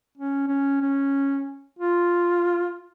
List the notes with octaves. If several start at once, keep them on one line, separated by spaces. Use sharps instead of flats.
C#4
C#4
C#4
F4